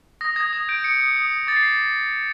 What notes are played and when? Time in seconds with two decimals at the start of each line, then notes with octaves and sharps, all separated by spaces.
0.21 D#6 A#6
0.36 D#6 G#6
0.53 D#6 G#6
0.69 G6 D7
0.84 D#6 C#7
1.00 D#6
1.16 D#6
1.32 D#6
1.47 D6 A6
1.56 C7